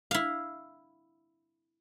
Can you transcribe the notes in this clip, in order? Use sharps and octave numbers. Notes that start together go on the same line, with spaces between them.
E4 F5